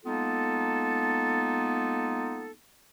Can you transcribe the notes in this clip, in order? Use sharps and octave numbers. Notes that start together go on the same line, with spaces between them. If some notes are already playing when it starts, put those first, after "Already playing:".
G#3 A#3 B3 D#4 F4 A4